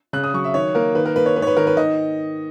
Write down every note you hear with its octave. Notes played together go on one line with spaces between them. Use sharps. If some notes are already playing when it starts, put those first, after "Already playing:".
C#3 F#6
D#6
F#3 C#6
E5
D#3 C#5
A#3 A#4
D#3 B4
A#4
A#3 B4
C#5
G#2 B4
C#5
B4
D#3 A#4
B4
D#3 D#5